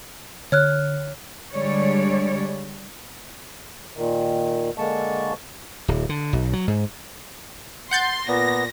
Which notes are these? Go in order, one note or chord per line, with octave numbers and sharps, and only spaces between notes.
D3 C#5 F6 F#6
D3 G3 G#3 C#5 D5
A#2 D#3
D3 G#3 A#3 A5 C#6
D1
D3
B1
F#3
G#2
F#5 C6 G6 A6
A#2 B3 A#6